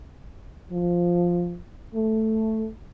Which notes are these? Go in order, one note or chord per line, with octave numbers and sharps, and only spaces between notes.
F3
A3